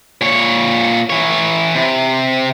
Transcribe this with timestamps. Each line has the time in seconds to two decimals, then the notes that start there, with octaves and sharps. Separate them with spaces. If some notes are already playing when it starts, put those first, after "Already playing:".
0.21 A#2 C#5
1.10 E3 C#5
1.75 C3